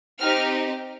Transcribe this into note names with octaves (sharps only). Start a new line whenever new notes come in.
C4 D#4 G4 F6